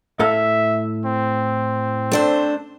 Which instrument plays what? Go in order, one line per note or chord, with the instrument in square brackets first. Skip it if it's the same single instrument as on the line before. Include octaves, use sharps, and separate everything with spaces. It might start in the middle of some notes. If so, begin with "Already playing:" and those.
[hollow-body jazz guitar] A2 A4 F5 [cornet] E5
[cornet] C4
[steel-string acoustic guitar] A3 D4 C5